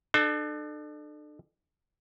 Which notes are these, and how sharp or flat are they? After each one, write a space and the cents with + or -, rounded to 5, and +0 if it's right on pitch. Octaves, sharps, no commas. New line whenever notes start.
D4 +40 A4 -10